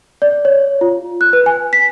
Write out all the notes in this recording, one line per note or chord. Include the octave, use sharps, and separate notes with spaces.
D5
C#5
F4
F#6
B4
G#5
B6